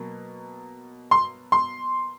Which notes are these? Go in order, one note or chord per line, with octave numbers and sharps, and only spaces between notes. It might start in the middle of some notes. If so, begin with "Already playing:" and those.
Already playing: B2 F#3 A#3
C6
C6